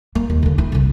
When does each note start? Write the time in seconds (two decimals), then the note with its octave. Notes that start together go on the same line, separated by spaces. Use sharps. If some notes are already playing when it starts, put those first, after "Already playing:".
0.15 A#3
0.30 D#2
0.42 D3 A#3
0.58 E4
0.72 C2 C#3